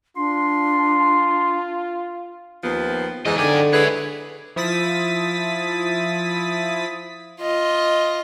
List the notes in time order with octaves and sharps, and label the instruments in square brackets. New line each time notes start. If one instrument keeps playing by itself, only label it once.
[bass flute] D4 [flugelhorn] F4 [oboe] C6
[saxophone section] D#2 F3 B3
[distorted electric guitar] F2 D#5 [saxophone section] G#2 E3
[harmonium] D3 [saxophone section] D#3 D5 [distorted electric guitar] F#3 G#5
[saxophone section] E4 G#4 B4 [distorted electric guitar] C#5 E5
[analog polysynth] F3 E4 D#6 A6 B6
[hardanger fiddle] F4 D#5